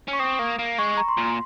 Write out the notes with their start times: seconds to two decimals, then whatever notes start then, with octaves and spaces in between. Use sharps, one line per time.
0.08 C#4
0.13 C#6
0.19 C4 D#6
0.39 A#3
0.59 A#3
0.78 G#3 C#6
0.97 A#5
1.09 C6
1.18 A#2